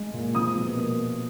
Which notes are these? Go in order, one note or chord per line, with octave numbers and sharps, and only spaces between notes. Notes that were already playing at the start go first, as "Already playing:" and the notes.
Already playing: G#3
A#2
F3 D#6
B2
A#3